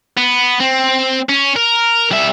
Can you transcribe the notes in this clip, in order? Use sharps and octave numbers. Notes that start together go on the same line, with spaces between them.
B3
C4
C#4
A#4
G3 E5